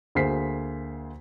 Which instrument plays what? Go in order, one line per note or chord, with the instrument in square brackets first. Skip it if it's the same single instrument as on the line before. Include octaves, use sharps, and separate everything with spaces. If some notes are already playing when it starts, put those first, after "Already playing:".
[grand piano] D2 A#3 G#4 C5 B6 C7